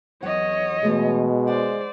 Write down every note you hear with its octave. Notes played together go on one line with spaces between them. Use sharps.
E2 F#3 C#5 D#5 F#5
B2 E3 G#3 A3 G#4
C5 D5 F#5